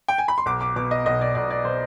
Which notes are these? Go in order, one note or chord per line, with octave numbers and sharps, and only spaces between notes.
G5
G#5
B5
C6
B1 D6
D6
B2 D6
D#5
B1 D#5
D5
B1 D5
D5
B2 C5